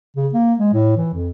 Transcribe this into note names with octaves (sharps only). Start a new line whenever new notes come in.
C#3
A#3
G#3
A2
E3
F2